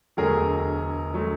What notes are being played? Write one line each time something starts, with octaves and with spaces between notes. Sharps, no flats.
E1 D2 D3 F#3 A3 G#4 A#4
D3 F#3 A3